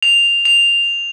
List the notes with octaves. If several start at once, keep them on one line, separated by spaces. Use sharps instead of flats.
F7
F7